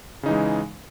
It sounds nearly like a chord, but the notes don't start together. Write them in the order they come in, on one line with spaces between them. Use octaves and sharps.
C#3 D#4 E3 G#3